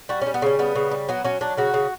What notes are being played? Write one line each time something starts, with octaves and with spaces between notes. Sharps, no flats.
G3 F#4
C#4
G3
B3
C#3 C#4
G3 B3
C#3
G3
F#3 B3
F#3 C#4
F#3 D4
C#3 F#4
C#3